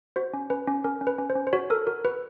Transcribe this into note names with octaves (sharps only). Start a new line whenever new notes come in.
F#4 C5
C#4
C#4 B4
C#4
C#4 A#4
C#4
B4
C#4
C5
C#4
C5
F#4 C#5
A4 A#4
F#4 A#4
F#4 B4